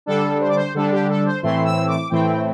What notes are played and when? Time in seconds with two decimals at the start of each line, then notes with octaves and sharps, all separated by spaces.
0.06 D3 G3 D4 A4
0.40 C5
0.48 D5
0.56 C5
0.74 D3 G3 D4 A4
0.92 G4
1.09 A4
1.25 C5
1.42 A2 E3 A3 C4 E4 C6
1.64 E6
1.87 D6
2.10 A2 E3 A3 C4 E4 G5